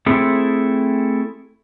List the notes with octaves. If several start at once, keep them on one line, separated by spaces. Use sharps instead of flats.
A3 C4 E4 G#4 A4